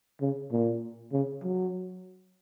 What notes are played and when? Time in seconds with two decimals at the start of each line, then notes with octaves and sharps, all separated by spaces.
0.21 C#3
0.52 A#2
1.12 C#3
1.43 F#3